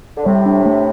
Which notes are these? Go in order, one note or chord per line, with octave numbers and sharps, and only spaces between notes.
D3
A2 C3 G3
D4
A3